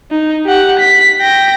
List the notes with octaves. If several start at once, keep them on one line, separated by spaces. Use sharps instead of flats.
D#4
G4 F#5
B6
G5 A#6